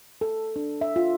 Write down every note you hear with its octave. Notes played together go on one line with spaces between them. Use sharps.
A4
D4
E5
F4